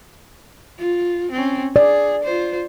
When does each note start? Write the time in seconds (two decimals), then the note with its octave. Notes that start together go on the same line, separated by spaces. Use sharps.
0.79 F4
1.32 C4 C#4
1.76 G#4 D5
2.24 F4 C5